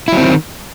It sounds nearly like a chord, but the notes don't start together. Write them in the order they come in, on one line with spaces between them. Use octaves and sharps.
E4 F#3 C4 D#3